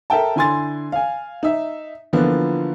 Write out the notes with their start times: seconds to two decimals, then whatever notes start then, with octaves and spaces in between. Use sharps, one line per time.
0.10 A4 A#4 E5 G5 A5
0.36 D3 E4 G#5 C6 A6
0.92 F5 G#5
1.43 D#4 E5
2.13 D3 E3 F3 A#3 B3 F4